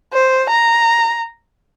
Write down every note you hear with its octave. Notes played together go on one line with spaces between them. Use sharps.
C5
A#5